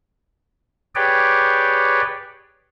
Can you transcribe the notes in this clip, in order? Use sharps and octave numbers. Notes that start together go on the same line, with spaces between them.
G4 G#4 B4 C#5 D5 G5